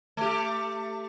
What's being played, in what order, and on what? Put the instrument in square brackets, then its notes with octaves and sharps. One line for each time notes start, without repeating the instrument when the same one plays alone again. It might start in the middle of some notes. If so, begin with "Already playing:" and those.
[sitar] A3 G4